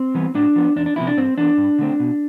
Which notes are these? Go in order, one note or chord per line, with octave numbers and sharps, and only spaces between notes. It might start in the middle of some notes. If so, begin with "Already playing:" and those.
Already playing: C4
E3 G3 B3
A2 D4
F3 B3
E2 D4
D4
C3 F3 B3 E4
D4
G2 C4
E3 B3 D4
G2
D3 A3 C4
B2